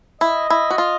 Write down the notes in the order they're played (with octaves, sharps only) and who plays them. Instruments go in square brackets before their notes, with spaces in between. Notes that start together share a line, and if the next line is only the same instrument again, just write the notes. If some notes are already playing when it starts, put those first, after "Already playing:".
[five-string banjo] E4 [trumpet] D#5
[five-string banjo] E4
F#4
F4